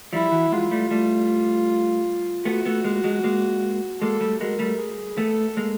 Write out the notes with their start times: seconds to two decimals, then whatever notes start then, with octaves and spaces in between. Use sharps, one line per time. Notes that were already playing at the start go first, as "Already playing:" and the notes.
0.13 F3 G3 E4
0.31 E3 F#3
0.52 F#3 G#3 F4
0.71 G3 A3
0.90 G3 A3
2.45 A3 B3 F#4
2.65 A3 B3
2.84 G#3 A#3
3.04 F#3 G#3
3.24 G#3 A#3
4.01 G#3 A#3 A4
4.21 G3 A3
4.40 F#3 G#3 A#4
4.59 G3 A3
4.79 G#4
5.18 A3 B3 A4
5.57 G#3 A#3